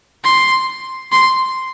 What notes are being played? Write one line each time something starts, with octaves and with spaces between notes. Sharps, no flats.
C6
C6